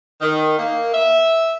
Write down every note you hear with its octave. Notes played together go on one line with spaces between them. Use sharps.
D#3
A#3
E5